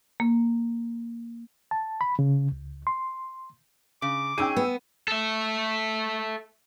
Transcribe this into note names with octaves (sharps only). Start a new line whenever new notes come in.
A#3
A5
B5
C#3
C#2
C6
C#3 D6
C#4 D#4 G#4 G5 E6 D#7
B3
A4 E5